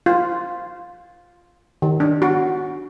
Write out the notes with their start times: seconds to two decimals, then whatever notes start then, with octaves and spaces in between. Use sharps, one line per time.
0.06 F4
1.82 D#3
2.00 D4
2.22 F#4